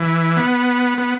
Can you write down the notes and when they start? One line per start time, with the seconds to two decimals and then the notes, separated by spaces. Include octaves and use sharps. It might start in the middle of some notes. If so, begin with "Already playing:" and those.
Already playing: E3
0.36 B3
0.98 B3